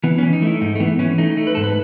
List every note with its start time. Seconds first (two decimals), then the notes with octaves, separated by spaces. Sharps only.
0.04 E3 B3
0.18 E3 C#4
0.33 D#4
0.42 A3 E4
0.61 G#2 D#4
0.75 A3
0.80 E3 B3
0.99 E3 C#4
1.18 A3 D#4
1.37 A3
1.47 B4
1.55 G#2 A4
1.64 B4